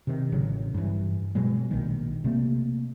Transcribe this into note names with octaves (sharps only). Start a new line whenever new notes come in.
C3 D#3
A1 C#3 F#3
G2 E3
B2 F#3 G#3
A#1 D#3
C3 A3 A#3